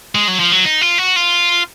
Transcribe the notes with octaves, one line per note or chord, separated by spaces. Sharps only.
G#3
F#3
F3
F#3
D#4
F4
F#4
F4